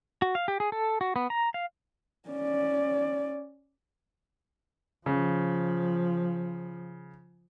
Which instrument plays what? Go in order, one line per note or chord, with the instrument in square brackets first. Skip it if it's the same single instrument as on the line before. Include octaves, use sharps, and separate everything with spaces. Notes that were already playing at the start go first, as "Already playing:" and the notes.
[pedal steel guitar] F#4
F5
G4
G#4
A4
F#4
B3
A#5
F5
[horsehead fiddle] C#4 D5
[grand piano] C#3 [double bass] F3